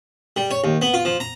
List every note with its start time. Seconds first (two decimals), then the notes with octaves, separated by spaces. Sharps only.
0.36 G3
0.51 C#5
0.64 D#2
0.82 B3
0.94 F4
1.05 F3
1.20 A#5